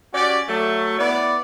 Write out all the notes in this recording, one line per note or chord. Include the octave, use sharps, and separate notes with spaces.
C#4 F#4 G4 D5
F#3 A3
B3 E4 D5